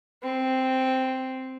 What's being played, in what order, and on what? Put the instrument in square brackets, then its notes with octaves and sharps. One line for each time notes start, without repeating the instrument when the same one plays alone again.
[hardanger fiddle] C4